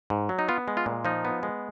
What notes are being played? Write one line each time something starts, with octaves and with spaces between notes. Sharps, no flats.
G#2
F#3
D#4
B3 F4
G#3
F4
A#2
F3 D#4
B3
G#3